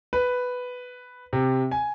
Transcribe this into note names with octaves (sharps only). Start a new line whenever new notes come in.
B4
C3
G#5